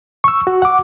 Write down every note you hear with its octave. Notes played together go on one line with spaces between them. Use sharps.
C#6 E6
F#4
F#5 D6